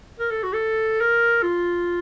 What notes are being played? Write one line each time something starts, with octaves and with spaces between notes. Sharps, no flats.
A#4
A4
F#4
A4
A#4
F4